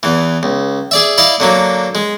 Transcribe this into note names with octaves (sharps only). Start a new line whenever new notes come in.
E2 E3
C#2
G#4 D5 E5
E4 D5 D#5 F5
D3 F#3 A#3
G#3